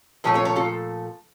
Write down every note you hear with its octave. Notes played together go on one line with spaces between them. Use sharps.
A#2 F3 A3 A4 C#5
A4 C#5
A4 C#5
F4 A4